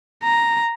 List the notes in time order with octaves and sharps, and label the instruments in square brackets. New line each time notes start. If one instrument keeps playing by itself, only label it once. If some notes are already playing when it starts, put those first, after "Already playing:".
[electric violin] A#5